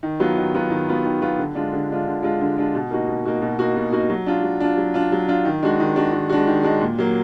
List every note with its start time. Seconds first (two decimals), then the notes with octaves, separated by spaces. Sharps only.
0.03 D#3
0.20 F#3 B3 F4
0.37 D#3
0.54 F#3 B3 F4
0.70 D#3
0.89 F#3 B3 F4
1.05 D#3
1.22 F#3 B3 F4
1.39 D3
1.55 G#3 D4 F4
1.73 D3
1.90 G#3 D4 F4
2.07 D3
2.23 G#3 D4 F4
2.41 D3
2.58 G#3 D4 F4
2.75 B2
2.91 A#3 D#4 F#4
3.08 B2
3.25 A#3 D#4 F#4
3.41 B2
3.59 A#3 D#4 F#4
3.76 B2
3.93 A#3 D#4 F#4
4.10 F#3
4.26 D4 F4
4.43 F#3
4.60 D4 F4
4.77 F#3
4.94 D4 F4
5.12 F#3
5.28 D4 F4
5.45 D#3
5.63 G#3 D4 F#4
5.80 D#3
5.96 G#3 D4 F#4
6.13 D#3
6.29 G#3 D4 F#4
6.47 D#3
6.63 G#3 D4 F#4
6.81 A#2
6.98 F#3 A#3